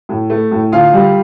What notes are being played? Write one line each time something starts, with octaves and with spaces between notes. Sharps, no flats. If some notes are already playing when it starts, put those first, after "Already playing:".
A2
A3
A2
D2 F4 F5
G3